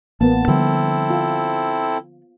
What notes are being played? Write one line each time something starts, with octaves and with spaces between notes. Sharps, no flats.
A1 A#3 B3 A5
D3 F3 G3 C4 E4 A4
F4